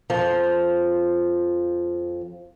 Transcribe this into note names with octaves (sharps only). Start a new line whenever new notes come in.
F2 F3